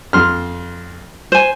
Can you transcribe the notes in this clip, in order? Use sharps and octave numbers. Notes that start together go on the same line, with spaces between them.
F2 C6 F6
C5 G#5